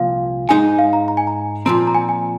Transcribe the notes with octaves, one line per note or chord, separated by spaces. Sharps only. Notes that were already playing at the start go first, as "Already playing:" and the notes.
Already playing: C2 A#2 F3 F5
G#2 G#3 D#4 C5 G#5
F5
A#5
A#5
G#5
A#5
A#2 F3 C4 A#5
A#5
G#5
G#5